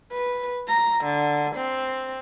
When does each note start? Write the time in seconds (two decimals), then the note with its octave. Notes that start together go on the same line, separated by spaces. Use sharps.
0.12 B4
0.68 A#5
1.04 D3
1.56 C4